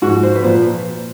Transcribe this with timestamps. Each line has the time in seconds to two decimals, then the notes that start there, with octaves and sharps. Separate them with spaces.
0.02 G#2 F3 F#4
0.23 C5
0.35 B4
0.43 A#2 F3 C5